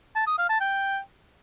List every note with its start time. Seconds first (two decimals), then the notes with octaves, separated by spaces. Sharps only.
0.15 A5
0.27 D#6
0.38 F5
0.49 A5
0.61 G5